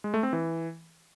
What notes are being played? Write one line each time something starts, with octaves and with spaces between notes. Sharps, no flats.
G#3
A3
C4
E3